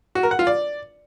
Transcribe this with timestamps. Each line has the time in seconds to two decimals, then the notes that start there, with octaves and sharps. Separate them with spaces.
0.15 F#4
0.23 A#4
0.31 F#5
0.39 F4
0.47 D5